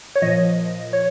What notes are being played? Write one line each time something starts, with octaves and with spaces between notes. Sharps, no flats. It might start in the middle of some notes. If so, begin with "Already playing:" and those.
C#5
A#2 F3 D#5
C#5